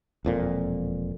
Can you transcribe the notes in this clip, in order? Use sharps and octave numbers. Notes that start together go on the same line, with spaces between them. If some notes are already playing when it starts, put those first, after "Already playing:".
E1 F2 A#2